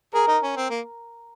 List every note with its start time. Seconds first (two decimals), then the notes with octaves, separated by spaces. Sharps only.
0.13 G#4 A#4
0.28 D#4
0.43 C#4
0.56 C4
0.70 A#3